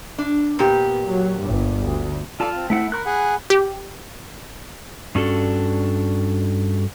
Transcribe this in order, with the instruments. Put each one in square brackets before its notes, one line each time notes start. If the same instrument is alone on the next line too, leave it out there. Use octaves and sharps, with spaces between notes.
[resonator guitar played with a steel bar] D4
[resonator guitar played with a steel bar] A#2 G4 [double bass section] B3
[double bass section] F#3
G1 G2
D2
[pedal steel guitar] F4 A5 [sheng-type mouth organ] A4 D5 F5
[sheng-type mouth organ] C4
[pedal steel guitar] A3 E4 F#5
[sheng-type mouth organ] A#4 [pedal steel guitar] B5 C#6 F#6
[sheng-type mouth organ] G#4 F#5 G#5
[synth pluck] G4
[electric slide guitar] G2 C#4 D4 F#4 A4